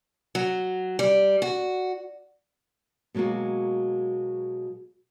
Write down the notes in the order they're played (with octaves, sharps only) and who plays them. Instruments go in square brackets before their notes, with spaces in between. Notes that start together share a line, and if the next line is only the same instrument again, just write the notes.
[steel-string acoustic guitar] F#3
G3
F#4
[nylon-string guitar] B2 F#3 G#3 A#3 F#4